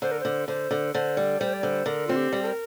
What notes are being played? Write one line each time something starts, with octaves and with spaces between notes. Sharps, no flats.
D3 C5
A#4
D3 C5
D3 C5
D3
D3 C5
G3 D5
G3 C5
D5
D3 C5
D3 A#4
C4 F4
G4
G3
A4
A#4